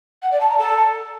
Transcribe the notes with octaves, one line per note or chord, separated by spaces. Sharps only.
F#5
D5
A5
A#5
A4